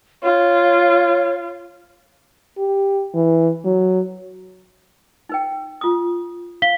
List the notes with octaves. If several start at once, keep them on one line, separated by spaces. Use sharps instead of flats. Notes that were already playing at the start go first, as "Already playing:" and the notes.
F4 C#5
G4
E3
F#3
D#4 B4 G5
F4 D#6
F5 B6 G7